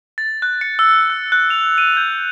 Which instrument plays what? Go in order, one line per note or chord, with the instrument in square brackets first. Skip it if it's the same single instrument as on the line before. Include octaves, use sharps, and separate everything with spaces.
[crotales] A6
F#6
C#7
E6
F#6
F#6
F7
D#7
G6